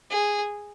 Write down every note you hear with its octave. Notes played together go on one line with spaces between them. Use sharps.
G#4